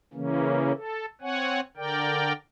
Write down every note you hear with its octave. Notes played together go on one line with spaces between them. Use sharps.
C#3 E3 A#3 C#4
A4
C4 C#5 F#5 G#5
D3 A#4 D5 G5